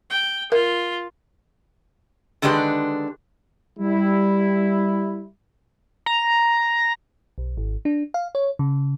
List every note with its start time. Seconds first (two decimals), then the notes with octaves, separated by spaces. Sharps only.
0.10 G5
0.52 F4 A#4
2.42 D3 D#3 G#3 D4 G4 B4
3.80 G3 E4
6.06 A#5
7.38 B1
7.57 G#1
7.85 D4
8.14 F5
8.35 C#5
8.59 C#3